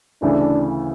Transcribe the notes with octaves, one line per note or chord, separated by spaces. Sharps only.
D2 C#3 E3 A3 D4